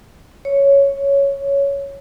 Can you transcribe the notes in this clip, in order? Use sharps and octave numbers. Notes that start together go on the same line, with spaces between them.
C#5